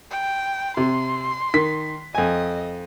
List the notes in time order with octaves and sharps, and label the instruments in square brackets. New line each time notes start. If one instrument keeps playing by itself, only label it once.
[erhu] G5
[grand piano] C3 [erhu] C6
[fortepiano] D#3 [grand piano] B6
[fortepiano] F2 G#5 [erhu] D#5